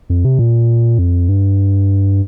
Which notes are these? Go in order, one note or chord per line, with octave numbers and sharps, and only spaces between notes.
F2
C3
A#2
F2
G2